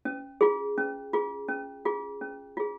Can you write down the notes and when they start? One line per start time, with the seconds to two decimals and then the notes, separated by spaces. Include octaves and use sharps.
0.05 C#4
0.41 F4 G#4
0.78 C#4
1.13 F4 G#4
1.48 C#4
1.85 F4 G#4
2.21 C#4
2.57 F4 G#4